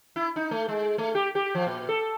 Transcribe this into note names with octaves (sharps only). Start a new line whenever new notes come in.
E4
D#4
A3
G#3
A3
G4
G4
F3
A#2
A4